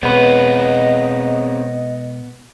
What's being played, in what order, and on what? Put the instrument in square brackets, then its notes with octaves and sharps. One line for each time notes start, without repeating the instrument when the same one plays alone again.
[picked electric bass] B2 G#3 [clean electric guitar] B3 B4 [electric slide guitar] C4 G#4 C#5 [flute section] D#5